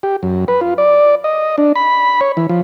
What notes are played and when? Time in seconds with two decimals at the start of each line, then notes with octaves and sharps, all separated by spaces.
0.03 G4
0.23 F#2
0.48 B4
0.61 F4
0.78 D5
1.24 D#5
1.58 D4
1.76 B5
2.21 C#5
2.37 E3
2.49 F3